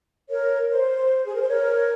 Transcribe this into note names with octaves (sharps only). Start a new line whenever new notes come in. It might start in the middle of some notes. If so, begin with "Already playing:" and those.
A#4 C#5
C5
G#4
A#4
C5
A#4 C#5